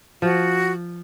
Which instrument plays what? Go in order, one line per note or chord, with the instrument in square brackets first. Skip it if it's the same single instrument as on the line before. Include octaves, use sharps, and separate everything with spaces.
[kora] F3 [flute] F#4